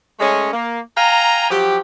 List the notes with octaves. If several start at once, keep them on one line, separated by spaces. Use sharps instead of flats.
G#3 A3 C#4
A#3
F5 G5 G#5 A#5
F3 F#3 G4